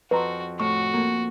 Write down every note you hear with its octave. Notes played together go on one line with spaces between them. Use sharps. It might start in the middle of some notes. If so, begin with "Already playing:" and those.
F2 F#4 B4 A#5 C6
A2 F#4 C#6
A#3